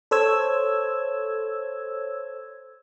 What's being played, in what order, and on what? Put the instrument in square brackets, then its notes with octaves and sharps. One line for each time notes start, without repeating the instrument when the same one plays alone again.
[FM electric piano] A4 C5 C#5 E6 G#6